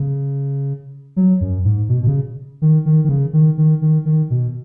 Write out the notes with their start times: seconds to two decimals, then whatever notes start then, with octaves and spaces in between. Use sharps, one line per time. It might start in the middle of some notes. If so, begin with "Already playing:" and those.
Already playing: C#3
1.16 F#3
1.41 F#2
1.64 G#2
1.89 B2
2.03 B2
2.07 C#3
2.62 D#3
2.86 D#3
3.05 D#3
3.09 C#3
3.33 D#3
3.58 D#3
3.82 D#3
4.05 D#3
4.30 B2